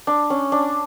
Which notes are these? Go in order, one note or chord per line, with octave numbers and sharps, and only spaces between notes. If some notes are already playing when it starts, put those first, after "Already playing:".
D4
C#4
D4